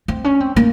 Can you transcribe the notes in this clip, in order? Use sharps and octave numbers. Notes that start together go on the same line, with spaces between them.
C4
C#4
C4
A#3